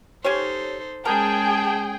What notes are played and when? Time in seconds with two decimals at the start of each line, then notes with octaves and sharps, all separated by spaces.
0.24 C#4 D#4 G4 A4 C5 C#5
1.05 G#3 C#4 G#4 A#4 G5 A5